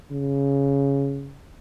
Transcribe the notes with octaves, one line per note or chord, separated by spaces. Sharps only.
C#3